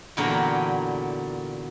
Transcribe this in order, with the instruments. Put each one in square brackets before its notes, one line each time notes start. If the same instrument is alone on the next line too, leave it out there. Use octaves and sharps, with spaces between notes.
[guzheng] E2 A#2 D3 F#3 A#3 G4